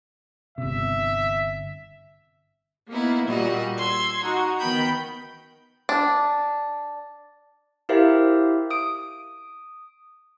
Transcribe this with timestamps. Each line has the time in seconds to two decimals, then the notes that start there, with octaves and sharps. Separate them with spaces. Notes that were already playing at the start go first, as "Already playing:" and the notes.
0.58 G1 C3 E5
2.89 A#3 B3 D#4 E4
3.26 A#2 G3 F#4 D#5
3.79 C6 E6 G#6
4.21 D#4 F#4
4.58 D#3 B3 G5 B5 G6
5.89 D4
7.89 E4 G4 A#4 C5 E5 F5
8.71 D#6 D7